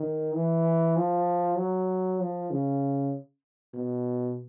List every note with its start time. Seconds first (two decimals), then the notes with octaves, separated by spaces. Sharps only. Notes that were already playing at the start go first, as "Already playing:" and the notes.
Already playing: D#3
0.35 E3
0.96 F3
1.58 F#3
2.20 F3
2.50 C#3
3.74 B2